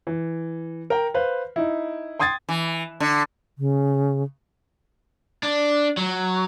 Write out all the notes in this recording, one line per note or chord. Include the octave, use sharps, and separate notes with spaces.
E3
A#4 G5
B4 C5 F5
D#4 E4
G5 C6 D#6 G#6 A6
E3
D3
C#3
D4
F#3